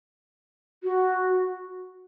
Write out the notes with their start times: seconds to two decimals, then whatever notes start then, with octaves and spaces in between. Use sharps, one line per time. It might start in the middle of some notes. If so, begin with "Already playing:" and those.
0.84 F#4